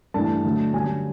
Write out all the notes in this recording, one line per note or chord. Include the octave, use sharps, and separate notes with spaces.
G2 E3 A3 D4 A5
D3 F#3 A3
F#2 D3 G3 G#5